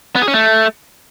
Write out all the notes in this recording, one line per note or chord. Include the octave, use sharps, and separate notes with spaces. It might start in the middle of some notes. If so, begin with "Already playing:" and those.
B3
G#4
C#4
A3